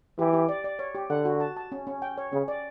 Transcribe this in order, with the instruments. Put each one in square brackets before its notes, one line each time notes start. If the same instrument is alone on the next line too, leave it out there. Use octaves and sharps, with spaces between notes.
[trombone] E3 [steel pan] G4
[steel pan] G4
D5
D5
C#5
G4
[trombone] D3 [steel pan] F#5
[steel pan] F#4
A5
A5
C#4
C#4
G5
C#5
[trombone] C#3 [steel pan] C#4
[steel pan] D5